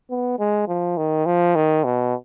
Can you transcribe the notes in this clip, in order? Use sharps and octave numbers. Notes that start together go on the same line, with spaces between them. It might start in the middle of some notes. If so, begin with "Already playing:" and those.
B3
G#3
F3
D#3
F3
D#3
B2